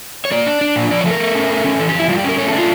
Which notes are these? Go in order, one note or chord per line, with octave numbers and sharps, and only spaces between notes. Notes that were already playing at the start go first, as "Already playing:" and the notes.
C#5
A#3 D5
D4
D4
A#2
F3 D5
C#5
A3
A#4
A3
C#4
A3
C#4
E3 A4
G4
F2 E4
G3 F4
G4
C#4 A#4
A3 C#5
A4
D4
F4